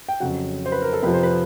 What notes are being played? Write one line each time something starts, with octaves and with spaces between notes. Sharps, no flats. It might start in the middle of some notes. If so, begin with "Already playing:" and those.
G5
F2 C#3 F#3 F#5
C5
B4
A#4
A4
F2 C3 F3 B4
C5
B4